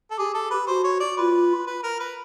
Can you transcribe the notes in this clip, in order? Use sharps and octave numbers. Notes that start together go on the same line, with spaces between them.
A4
G4 G#4
A4
B4
F#4 C5
C#5
D5
F4 B4
B4
A#4
B4